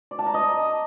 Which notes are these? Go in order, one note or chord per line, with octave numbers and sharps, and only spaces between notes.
D5
A5
A#5
D#5